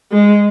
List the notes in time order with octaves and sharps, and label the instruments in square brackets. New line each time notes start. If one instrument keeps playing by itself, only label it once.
[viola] G#3